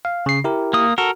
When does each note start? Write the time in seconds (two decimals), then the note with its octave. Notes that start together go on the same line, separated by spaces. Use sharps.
0.05 F5
0.26 C#3 C7
0.44 E4 G4 A#4
0.73 A#3 D#6
0.98 F#4 A4 A#4